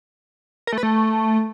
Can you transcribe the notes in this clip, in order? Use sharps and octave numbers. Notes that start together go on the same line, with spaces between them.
A#4
A3
B4
A3